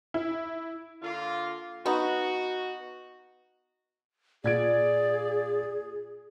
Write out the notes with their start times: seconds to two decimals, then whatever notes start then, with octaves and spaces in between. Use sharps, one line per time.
0.14 E4
1.02 D3 A#3 F4
1.86 B3 D#4 F#4
4.44 A#2 G#4 D5 G#6 D7